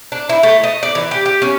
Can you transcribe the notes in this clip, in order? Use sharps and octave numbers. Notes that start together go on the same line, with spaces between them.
D4
E4
A3
D#5
D5
E3
G4
G4
C#4